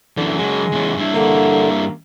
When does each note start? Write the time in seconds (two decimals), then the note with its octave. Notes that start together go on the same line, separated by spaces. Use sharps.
0.17 F#2 D3 E3
0.39 C#3 F#3 G#3
0.72 E2 C#3
0.97 G2 E4
1.14 D3 A#3